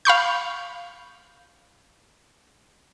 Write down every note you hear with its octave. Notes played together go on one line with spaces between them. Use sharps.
F5 B5 C#6 G6